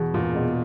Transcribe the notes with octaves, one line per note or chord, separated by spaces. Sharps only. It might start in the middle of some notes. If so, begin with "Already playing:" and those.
Already playing: E2 B2
E1 A#2
B2